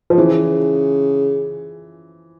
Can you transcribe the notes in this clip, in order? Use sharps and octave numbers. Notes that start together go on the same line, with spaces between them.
F3
C#3 E3